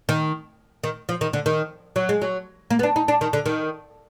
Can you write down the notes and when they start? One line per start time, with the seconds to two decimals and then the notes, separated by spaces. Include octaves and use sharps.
0.09 D#3
0.84 D#3
1.09 F3
1.21 D#3
1.33 D3
1.46 D#3
1.96 F#3
2.09 G#3
2.22 F#3
2.70 A#3
2.79 B3
2.83 D4
2.96 D#4
3.08 D4
3.21 D#3
3.33 D3
3.46 D#3